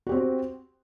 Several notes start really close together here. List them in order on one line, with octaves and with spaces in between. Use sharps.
F#4 G4 C4